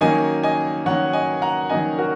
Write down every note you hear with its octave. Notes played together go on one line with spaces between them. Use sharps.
D#3 F#3 A#3 C#4 D#5 G#5
D#5 G#5
D#3 F#3 A#3 C#4 C#5 F#5
D#5 G#5
F#5 A#5
D#3 F#3 A#3 C#4 D#5 G#5
F#4 A#4